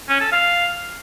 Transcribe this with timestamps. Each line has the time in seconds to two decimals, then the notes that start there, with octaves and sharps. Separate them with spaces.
0.09 C#4
0.20 A4
0.32 F5